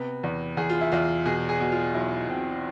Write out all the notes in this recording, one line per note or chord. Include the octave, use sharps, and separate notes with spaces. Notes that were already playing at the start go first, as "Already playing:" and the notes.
Already playing: C3 B3
E2
E2 G#4
F4
E4
E2 F4
B2 G#4
G#4
B2
F4
B1 E4
B2 C4